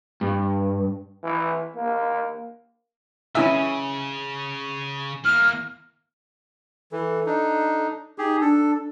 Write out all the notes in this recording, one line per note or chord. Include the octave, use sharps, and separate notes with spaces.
G2
E3
A#3
C#3 C#4 E4 E5 G#5 E6
E3 A#3 F6
E3 A4
D4 D#4
D#4 G4 G#4
D4 A4